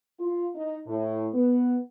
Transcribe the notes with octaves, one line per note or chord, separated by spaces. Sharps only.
F4
D#4
A2
B3